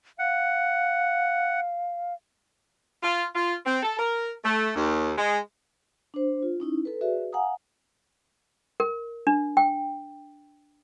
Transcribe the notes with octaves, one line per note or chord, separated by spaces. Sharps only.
F5 F#5
F4
F4
C4
A4
A#4
A3
D#2
G#3
D4 C5
F4
C#4 D#4 E4
A4 B4
F#4 G#4 B4 D5 E5
F5 F#5 G#5 A#5 D#6
A#4
D4
G5